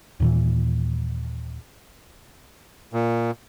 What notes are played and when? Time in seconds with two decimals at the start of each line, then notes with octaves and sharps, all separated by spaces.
0.20 D#2 A#2 E3
2.93 A#2